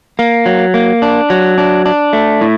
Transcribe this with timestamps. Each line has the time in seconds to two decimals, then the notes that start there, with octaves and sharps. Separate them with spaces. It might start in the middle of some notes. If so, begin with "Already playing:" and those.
0.19 A#3
0.46 F#3
0.74 A#3
1.02 D4
1.30 F#3
1.58 D4
1.86 D4
2.13 A3
2.41 A2